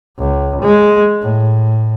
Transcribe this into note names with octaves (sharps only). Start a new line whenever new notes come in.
C#2
G#3
A2